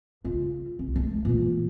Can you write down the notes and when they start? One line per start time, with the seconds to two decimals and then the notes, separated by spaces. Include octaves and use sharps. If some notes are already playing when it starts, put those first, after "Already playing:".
0.25 C#3 F4
0.79 C2
0.96 G#3 A3
1.25 A#2 E3